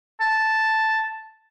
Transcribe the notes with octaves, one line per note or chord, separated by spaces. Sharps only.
A5